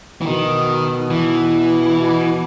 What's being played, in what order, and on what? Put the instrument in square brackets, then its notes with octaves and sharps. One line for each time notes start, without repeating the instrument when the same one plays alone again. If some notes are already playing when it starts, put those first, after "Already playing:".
[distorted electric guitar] E3
[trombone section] B2 [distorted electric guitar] D#3
[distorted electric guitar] E3
[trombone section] B2